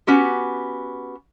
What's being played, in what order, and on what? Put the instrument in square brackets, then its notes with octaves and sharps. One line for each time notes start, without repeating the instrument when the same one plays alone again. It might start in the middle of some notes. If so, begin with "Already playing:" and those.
[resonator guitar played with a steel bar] B3 C#4 F#4 G4